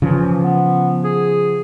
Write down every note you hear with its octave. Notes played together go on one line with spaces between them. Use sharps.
C#3 E3 F3
B3
G#4